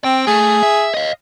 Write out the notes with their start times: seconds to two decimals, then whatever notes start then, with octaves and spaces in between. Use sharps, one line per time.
0.04 C4 G5
0.27 A3 G#4
0.63 E5
0.94 D#5 F5